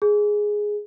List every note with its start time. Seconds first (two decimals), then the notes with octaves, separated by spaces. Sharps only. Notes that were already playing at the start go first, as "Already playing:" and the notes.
0.02 G#4